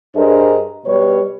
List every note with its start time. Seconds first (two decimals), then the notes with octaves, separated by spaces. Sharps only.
0.15 G2 D4 G#4 A#4 C5 D#5
0.87 B2 G3 B4 C#5